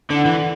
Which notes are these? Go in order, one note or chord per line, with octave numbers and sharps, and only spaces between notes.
D3 E4 A4 D5 F#5
E3